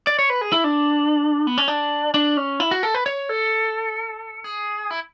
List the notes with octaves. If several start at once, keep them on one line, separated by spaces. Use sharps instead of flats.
D5
C#5
B4
G#4
E4
D4
B3
C#4
D4
D4
C#4
E4
F#4
A4
B4
C#5
A4
G#4
E4